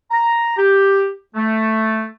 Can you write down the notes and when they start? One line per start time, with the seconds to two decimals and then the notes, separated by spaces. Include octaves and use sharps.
0.11 A#5
0.58 G4
1.36 A3